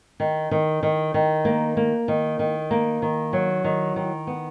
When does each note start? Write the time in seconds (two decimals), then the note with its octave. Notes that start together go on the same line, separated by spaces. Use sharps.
0.20 D#3
0.51 D#3
0.83 D#3
1.14 D#3
1.45 A#3
1.77 A#3
2.08 D#3
2.39 D#3
2.71 A#3
3.02 D#3
3.33 F#3
3.64 D#3
3.96 D#3
4.27 B3